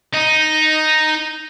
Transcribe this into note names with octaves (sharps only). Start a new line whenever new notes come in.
D#4